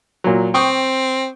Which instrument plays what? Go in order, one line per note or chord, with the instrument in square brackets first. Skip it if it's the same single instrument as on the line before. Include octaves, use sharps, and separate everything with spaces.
[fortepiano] A#2 F#3
[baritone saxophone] C4 [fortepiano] G5 C#6 D#6